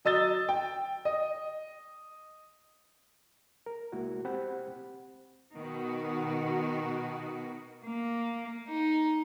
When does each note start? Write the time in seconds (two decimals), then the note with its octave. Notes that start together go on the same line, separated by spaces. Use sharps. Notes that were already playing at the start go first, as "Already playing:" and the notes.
0.05 F#3 D#5 E6 A6 G7
0.49 G5
1.05 D#5
3.66 A#4
3.92 C2 G#3 A#3 E4 F#4
4.25 C4 G4 C5 F#5 B5
5.55 B2 D#3 F#4
7.84 A#3
8.68 D#4